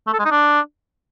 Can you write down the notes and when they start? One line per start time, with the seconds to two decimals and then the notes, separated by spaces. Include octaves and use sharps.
0.07 A3
0.13 A4
0.19 G#3
0.25 D#4
0.31 D4